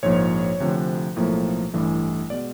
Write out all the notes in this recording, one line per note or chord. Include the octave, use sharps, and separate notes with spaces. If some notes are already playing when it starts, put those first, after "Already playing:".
A#1 G#2 F3 A#3 C#5
D2 C3 F3
B1 A2 F3 A#3
A1 G2 E3 A3
B2 G#3 D5